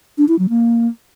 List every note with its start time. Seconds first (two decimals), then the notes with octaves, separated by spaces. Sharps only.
0.18 D4
0.28 E4
0.39 F#3
0.49 A#3